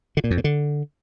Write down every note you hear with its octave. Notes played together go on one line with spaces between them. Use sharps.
D3
A#2
F2
A#2
D3